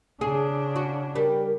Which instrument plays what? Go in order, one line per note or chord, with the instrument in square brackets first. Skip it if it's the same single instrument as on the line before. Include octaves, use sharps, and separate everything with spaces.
[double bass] C#3 D4 [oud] G#4
[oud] F#4
[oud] G3 [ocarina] A#4